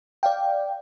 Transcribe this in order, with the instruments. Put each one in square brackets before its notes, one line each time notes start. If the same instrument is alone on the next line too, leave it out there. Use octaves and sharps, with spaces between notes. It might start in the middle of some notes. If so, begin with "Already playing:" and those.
[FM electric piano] D5 F5 G5